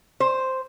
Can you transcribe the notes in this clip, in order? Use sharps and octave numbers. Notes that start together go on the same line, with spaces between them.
C5